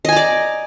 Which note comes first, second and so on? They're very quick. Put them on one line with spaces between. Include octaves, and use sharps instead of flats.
D#5 G#5 A#5 D5